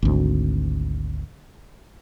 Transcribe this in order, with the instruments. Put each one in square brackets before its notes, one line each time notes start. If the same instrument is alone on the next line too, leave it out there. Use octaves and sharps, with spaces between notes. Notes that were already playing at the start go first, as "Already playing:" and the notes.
[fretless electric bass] G#1 D2